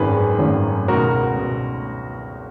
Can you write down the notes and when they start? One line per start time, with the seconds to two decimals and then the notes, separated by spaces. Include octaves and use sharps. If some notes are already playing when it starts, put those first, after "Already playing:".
Already playing: G#1 F#2 D#3 G#4 B4
0.39 G#1 F#2 D#3
0.88 C#2 B2 F#4 A#4
1.38 B2